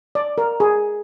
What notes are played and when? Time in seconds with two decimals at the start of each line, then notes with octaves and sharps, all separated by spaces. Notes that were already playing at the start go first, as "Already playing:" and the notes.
0.15 D5
0.38 A#4
0.60 G#4